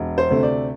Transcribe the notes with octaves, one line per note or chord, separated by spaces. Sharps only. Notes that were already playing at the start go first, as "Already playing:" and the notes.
Already playing: E1
C5
D2 C3 A3 C4
D5